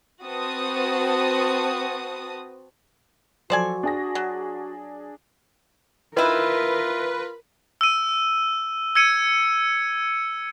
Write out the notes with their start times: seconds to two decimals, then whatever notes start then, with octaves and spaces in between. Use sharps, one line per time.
0.22 C4 F#4 B4 A5 D#6
3.50 F3 F#3 F#4 A4 C5 D5 G#5
3.83 D4 G#4 A#6
4.15 F#3
6.17 D#3 E4 F4 A#4 B4
7.81 E6 D#7
8.95 E6 G#6 C#7 D#7